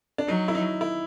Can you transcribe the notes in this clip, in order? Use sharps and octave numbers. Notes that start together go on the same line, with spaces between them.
D4
F#3 D#4
E4
D#4
E4